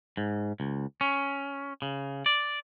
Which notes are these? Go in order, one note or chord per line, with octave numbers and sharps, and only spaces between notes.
G#2
C#2
C#4
C#3
D5